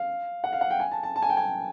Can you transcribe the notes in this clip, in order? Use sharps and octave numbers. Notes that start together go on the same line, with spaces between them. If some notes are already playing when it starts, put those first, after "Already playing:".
Already playing: F5
F#5
F5
F#5
G5
G#5
A5
A5
A5
G#5
G5
G#5